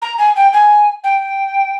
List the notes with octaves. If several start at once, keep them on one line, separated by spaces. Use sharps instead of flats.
A#5
G#5
G5
G#5
G5